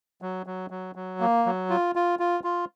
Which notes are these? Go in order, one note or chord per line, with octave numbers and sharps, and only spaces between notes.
F#3
F#3
F#3
F#3
A#3
F#3
F4
F4
F4
F4